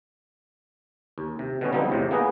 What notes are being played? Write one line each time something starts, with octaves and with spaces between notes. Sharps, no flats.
D#2
C3
B2 D3 D#3 G3 B3 C#4
D3 F3 G3 B3 C4 D#4
E2 A2 C3
A#3 B3 D#4 G#4 B4 D#5